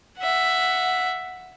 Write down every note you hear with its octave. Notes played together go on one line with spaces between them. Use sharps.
E5 F#5